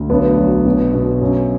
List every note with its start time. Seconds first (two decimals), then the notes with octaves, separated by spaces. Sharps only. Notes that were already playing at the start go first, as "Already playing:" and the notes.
Already playing: D2
0.10 B1 B3 D4
0.38 F#3
0.65 B2
0.94 B2
1.21 F#2